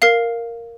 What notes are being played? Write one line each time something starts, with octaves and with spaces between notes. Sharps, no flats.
A#4 F5 C7